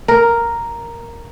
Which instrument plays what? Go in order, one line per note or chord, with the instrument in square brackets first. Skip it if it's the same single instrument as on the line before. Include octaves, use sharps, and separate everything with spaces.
[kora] A#4